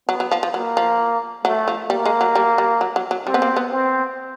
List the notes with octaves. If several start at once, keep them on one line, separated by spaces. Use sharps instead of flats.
F#3 B3
F#3
F3
F3
F#3 A#3
F3
F#3 A3
F3
G3 A#3
G#3
F#3
G3
G3
F#3
F#3
F#3
G3 C4
B3
A#3
B3
C4